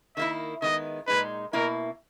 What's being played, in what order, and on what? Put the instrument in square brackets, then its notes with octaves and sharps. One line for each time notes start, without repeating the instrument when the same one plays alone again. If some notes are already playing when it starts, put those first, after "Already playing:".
[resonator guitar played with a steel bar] D#3 A#3 E4 [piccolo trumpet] E5
[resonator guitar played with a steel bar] D#3 G#3 B3 [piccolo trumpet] D#5
[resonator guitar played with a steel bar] A#2 G#3 D#4 [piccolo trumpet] B4
[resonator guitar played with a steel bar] B2 A#3 E4 [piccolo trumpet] A#4